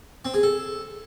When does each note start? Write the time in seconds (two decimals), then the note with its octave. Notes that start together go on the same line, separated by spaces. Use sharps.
0.25 C4
0.34 G#4
0.43 A4